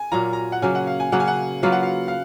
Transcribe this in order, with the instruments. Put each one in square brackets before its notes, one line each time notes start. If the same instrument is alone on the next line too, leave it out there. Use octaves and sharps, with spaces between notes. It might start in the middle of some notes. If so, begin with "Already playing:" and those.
Already playing: [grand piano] G#5
[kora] A#2 F#3 A#3 F4 [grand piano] A#5
[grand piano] A#5
F#5
[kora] C#3 F#3 A#3 [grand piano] G#5
[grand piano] F#5
F5
G#5
[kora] C#3 F#3 A#3 [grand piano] F#5
[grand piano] G#5
F#5
[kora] F#3 A#3 F4 B4 [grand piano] F5
[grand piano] F#5
F5
F5